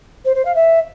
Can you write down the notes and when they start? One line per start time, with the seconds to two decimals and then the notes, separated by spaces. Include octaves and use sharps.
0.25 C5
0.35 C5
0.45 F5
0.55 E5